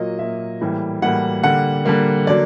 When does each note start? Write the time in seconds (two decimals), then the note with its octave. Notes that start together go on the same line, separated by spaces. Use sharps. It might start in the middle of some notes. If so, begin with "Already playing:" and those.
Already playing: A#2 F#3 A#3 D#5
0.18 A#2 F#3 A#3 E5
0.61 A2 E3 G3 A#3
1.02 A2 E3 G3 A#3 F#5
1.43 D3 G3 A#3 F#5
1.85 D3 G3 A#3
2.26 D3 F#3 A#3 D5